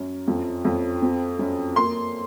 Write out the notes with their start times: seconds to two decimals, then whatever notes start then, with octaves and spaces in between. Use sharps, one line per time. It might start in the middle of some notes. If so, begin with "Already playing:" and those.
Already playing: F#2 C#4
0.28 F2
0.65 F2
1.02 C4
1.39 F#2
1.76 A#3 C6